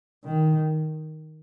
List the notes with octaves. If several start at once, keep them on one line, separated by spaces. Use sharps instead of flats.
D#3